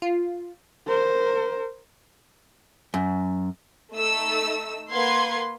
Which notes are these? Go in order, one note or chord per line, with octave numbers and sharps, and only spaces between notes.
F4
A#4 C5
F#2
A3 D#4 E6
A#3 B4 F5 F#5 C6 G#6